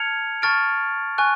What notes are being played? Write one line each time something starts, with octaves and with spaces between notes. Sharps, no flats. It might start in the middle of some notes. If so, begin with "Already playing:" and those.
Already playing: A5 F6 G#6 C#7 F7
A5 C#6 F6 A6 D7
G#5 C#6 F#6